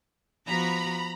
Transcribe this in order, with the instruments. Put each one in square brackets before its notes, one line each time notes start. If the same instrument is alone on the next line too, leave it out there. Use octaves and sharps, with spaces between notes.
[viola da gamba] F3 B3 F#4 [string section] A#5 B5